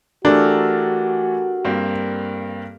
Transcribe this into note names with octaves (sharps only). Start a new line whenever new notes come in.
E3 A3 D4 F#4 G4 A4 A#4
G2 A#3 C4